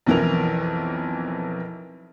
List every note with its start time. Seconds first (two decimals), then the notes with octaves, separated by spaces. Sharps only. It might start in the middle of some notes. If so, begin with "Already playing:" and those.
0.07 B1 F2 E3 A#4 F7